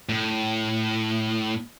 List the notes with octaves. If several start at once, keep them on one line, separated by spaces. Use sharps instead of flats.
A2